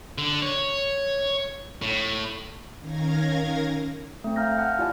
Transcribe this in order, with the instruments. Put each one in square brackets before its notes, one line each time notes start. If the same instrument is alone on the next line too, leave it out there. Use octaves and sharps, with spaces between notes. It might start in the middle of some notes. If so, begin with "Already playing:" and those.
[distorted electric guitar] D3
C#5
A2
[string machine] D#3 C#4 A#4 F5 G#6 A#6
[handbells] A3 C4
C4 F5 A#5 F6 G6 A#6
F5 F#5 G#5 A5 F6 F#6
E4 F4 G4 D5 G#5 A5